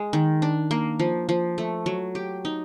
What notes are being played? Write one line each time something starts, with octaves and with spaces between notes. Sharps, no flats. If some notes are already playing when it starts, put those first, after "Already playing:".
Already playing: G#3
D#3
D4
A#3
F3
F3
A3
F#3
G4
D#4